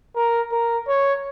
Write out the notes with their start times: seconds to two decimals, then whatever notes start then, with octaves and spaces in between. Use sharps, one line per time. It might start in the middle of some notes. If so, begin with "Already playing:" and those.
0.16 A#4
0.52 A#4
0.88 C#5